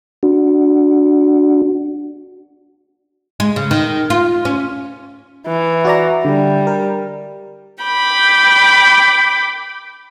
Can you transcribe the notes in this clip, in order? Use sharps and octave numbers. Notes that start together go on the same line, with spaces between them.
D4 F#4
G#3
C#3
D#3
F4
C#4
E3
F#4 D5 A#5
D3 G3
A#4
G5 B5 D6